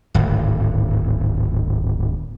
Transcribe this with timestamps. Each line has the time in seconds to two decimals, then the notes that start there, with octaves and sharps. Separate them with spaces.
0.14 D1 G#1